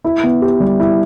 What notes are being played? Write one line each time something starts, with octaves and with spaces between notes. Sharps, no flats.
E4
B3
G4
G3
E4